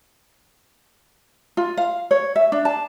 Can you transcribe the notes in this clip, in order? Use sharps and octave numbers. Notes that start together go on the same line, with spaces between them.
F4
F5
C#5
E5
D4
A5